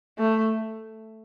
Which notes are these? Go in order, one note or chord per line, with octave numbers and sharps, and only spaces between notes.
A3